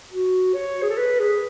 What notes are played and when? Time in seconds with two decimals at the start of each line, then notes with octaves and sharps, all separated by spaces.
0.12 F#4
0.54 C#5
0.82 G#4
0.90 A4
0.98 B4
1.20 G#4